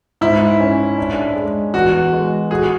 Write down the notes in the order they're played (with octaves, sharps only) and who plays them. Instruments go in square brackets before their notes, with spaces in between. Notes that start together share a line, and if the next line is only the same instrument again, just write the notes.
[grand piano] G#2 [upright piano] E4
[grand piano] C#4
D4
G#3
[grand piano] E2 [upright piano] F#4
[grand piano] G#3
[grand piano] F#4 [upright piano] G#4